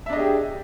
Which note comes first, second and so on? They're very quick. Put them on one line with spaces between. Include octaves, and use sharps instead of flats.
E5 D4 D#5 G#4 G4